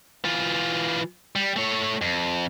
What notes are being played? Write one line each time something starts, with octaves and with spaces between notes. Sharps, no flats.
E3 F4
G3
A3 C#5
F2